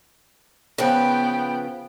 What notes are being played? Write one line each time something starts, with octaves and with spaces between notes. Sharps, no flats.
C#3 F3 B3 B4 G5